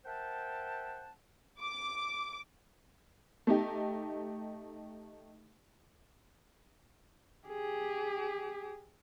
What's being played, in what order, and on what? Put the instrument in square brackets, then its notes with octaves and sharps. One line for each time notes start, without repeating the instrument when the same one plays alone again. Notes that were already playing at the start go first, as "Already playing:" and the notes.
[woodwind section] A#4 C5 E5 F#5 G5 A5
[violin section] D6
[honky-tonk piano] A3 D#4 G4
[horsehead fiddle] G4 G#4